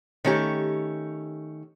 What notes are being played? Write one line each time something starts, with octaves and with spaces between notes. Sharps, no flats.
D#3 A3 C#4 G4